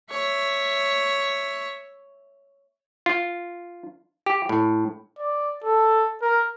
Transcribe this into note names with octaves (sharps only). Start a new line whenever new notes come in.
C#5 E5
F4
G4
A2
D5
A4
A#4